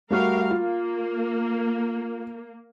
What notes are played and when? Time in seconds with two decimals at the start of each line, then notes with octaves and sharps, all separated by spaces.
0.11 G3 A3 F#4 A#4 F5
0.51 A#3 F4